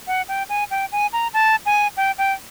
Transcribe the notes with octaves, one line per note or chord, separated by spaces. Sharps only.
F#5
G5
G#5
G5
G#5
A#5
A5
G#5
G5
G5